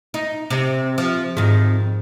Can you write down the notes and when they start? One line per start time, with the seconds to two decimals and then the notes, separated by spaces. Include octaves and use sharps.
0.14 D#4
0.50 C3
0.98 F3
1.37 F2 G#2 D#3